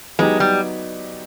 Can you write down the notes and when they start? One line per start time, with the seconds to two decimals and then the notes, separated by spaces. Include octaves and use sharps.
0.19 F#3 G#3 B3 D#4 G4
0.40 G3